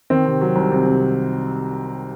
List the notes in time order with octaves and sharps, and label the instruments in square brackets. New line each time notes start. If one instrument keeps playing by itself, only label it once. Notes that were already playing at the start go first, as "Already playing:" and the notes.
[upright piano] D#3 C4
C3
F#3
C2
C3
C3